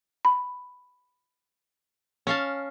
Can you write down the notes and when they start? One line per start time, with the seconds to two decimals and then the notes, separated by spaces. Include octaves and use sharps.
0.25 B5
2.27 C#4 F5 A5